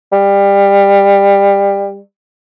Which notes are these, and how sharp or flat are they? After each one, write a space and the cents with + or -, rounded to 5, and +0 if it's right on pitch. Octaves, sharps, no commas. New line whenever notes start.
G3 +25